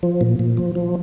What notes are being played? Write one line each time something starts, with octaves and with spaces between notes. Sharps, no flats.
F3
A#2
A#2
F3
F3